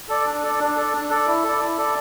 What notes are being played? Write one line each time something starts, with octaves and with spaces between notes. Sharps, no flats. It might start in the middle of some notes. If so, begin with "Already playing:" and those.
A4 D5
D4
A4 D5
D4
A4 D5
D4
A4 D5
E4
A4 D5
E4
A4 D5